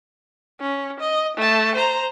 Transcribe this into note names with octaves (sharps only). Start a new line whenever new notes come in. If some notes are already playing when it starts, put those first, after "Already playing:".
C#4
D#5
A3 A5
C5 A#5